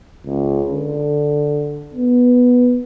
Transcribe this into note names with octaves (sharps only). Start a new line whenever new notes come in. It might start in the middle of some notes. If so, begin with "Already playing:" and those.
C#2
D3
B3